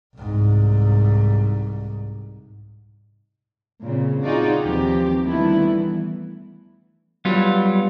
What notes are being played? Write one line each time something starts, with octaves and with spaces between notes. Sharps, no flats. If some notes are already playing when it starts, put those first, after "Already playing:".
C2 G#2
A#2 C#3 C4
D#4 F4 F#4 G#4 D5
D#2 B2 D#3 F3 C4 G4
D3 D#3 G3 A3 B3 E4
E3
F#3 G3 B3 F4